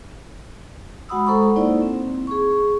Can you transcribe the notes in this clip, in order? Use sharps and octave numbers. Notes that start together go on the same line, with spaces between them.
G#3 F#4 F#5 B5 D#6 E6
G#3 A4 C5 F#5 A#5 C#6
A#3 D#4 E4 C5 D5
C4
G#4 C#6